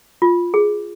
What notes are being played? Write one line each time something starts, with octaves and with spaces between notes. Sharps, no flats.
F4
G#4